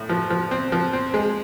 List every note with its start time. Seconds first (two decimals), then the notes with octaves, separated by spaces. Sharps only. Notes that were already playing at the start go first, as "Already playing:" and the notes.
Already playing: A2
0.09 F3
0.30 F3
0.51 C4
0.72 F3
0.93 C4
1.14 G#3